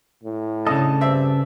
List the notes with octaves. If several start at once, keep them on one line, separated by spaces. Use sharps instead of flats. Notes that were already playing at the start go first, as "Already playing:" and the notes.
A2
C#3 D4 A4 D#5
G2 C4 E5